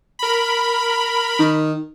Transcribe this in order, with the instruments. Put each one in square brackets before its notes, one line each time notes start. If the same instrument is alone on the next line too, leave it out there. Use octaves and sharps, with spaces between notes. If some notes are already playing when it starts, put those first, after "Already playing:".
[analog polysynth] A#4 B5
[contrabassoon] D#3